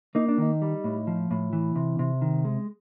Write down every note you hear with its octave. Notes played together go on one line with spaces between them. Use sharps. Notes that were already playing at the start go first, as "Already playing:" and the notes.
A#3 D#4
D4
D#3 D#4
G3
A2
F3
A2
E3
C3
C3
D#3
G#3